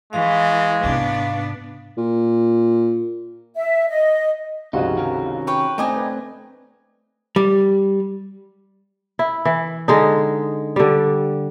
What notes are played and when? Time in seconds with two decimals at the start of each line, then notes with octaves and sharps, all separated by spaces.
0.13 E3 G#3 F5 C#6
0.84 G#2 C3 B3 D4
1.97 A#2
3.56 E5
3.89 D#5
4.73 C#2 G2 C3 F3 D#4 F#4 G#4
4.96 D#3 C#4 A#4
5.47 B4 C#5 G5
5.78 A3 C4 D4 D#4 D#5 G5 G#5 D6
5.96 B4
7.36 G3
9.19 E4
9.45 E3
9.88 D3 G#3 D#4
10.76 D3 G3